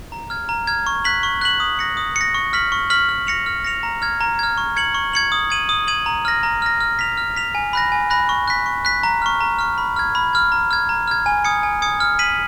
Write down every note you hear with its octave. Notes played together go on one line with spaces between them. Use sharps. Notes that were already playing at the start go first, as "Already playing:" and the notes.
A#5
F6 G#6
A#5
F6 G#6
C#6
F#6 B6 F#7
C#6
F#6 B6 F#7
D#6
A#6 C#7
D#6
A#6 C#7
C#6
F6 B6 F#7
C#6
F6 B6 F#7
F6
A#6 C#7 F7
F6
A#6 C#7 F7
A#5
F6 G#6
A#5
F6 G#6
C#6
G#6 C#7 F#7
C#6
G#6 C#7 F#7
D#6
G#6 D#7 F#7
D#6
G#6 D#7 F#7
A#5
F6 A#6
A#5
F6 A#6
F6
B6 F7
F6
B6 F7
G#5
B5 F#6 A#6
G#5
B5 F#6 A#6
C#6
F#6 B6
C#6
F#6 B6
A#5
C#6 F6
A#5
C#6 F6
B5
F6 G#6
B5
F6 G#6
A#5
F6 G#6
A#5
F6 G#6
G#5
D#6 G#6 C#7
G#5
D#6 G#6 C#7
F6
B6 D#7 F#7